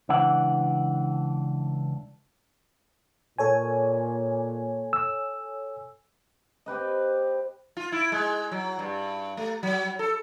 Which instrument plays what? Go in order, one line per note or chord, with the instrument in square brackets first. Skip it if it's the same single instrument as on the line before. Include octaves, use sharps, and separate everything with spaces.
[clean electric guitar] C#2 E3 D4 F#5
[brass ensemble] A#2 [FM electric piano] A4 C#5 G#5
[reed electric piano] E6
[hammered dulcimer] C4 G4 B4 D#5
[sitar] F4
E4
G#3
F#3
G2
A3
F#3
A4